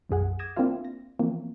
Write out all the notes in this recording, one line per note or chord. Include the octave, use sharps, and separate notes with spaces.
B1 F#2 G#4 F#5
D6 D#6 G#6 A#6 E7
A#3 C4 D4 E4 F4 F5
A#6
E3 F3 A#3 C4